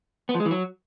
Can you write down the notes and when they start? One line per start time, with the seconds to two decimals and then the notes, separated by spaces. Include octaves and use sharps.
0.29 B3
0.34 F3
0.40 G#3
0.45 E3
0.51 F#3